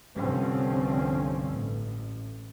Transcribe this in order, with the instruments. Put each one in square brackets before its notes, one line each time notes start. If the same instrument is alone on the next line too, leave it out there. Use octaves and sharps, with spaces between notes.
[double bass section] C2 G2 D3 F3 C4 C#4
A1